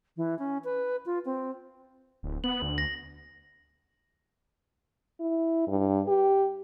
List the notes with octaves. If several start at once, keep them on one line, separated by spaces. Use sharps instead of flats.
E3
C#4
B4
F4
C4
D1
B3 F#7
D2
A#6
E4
G2
G4